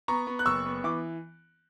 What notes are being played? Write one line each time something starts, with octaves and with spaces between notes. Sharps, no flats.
B3 A#5 C#6
B3
F#6
F#1 C#6 E6
B3
E3 D6